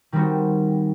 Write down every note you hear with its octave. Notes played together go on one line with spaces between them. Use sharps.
D#3 G3 C4 D#4 F#4